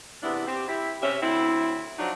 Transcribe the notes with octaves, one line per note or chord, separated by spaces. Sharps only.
E2 C3 B3 D4 E4
C4 G4
E4 G4
C3 C#4 G4 E5
D2 C4 E4
F3 F#3 D4 D#4 F#4